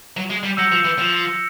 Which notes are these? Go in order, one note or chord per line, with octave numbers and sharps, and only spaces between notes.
F#3
G#3
G3
F#3 E6 G6 A#6 C#7 E7
F3
E3
F3